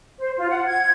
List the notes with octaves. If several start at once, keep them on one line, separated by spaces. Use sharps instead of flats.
C5
F4
F#5
G#6